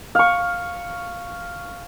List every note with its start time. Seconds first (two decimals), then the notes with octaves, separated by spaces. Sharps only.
0.15 F5 C#6